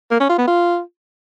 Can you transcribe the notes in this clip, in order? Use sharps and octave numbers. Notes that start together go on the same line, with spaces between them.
A#3
C#4
F4
B3
F4